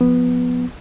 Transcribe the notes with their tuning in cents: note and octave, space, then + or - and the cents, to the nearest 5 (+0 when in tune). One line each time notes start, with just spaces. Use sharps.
F3 +15 B3 +0